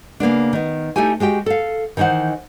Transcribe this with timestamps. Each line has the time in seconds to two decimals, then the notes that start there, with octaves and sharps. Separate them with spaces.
0.20 C#3 A#3 B3 D4
0.53 D#3 B3
0.96 A3 D#4 E4 G4 G#5
1.20 G#3 F#4 G4 G5
1.46 A4 F5
1.97 D#3 E3 D#4 C5 F#5